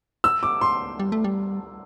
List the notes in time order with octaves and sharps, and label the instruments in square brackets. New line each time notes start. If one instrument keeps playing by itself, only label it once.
[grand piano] E6
D6
C6
[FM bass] G3
A3
G3